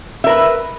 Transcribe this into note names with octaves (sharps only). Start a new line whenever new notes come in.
A#4 B4 E5